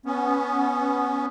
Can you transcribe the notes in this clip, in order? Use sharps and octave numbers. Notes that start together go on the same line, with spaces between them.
B3 C#4